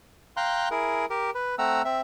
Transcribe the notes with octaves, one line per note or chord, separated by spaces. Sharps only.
F5 G5 A#5 C6 F#6
E4 G#4 A#4
G4 A#4
B4
A3 C4 F#5 A#5 E6
C4 E5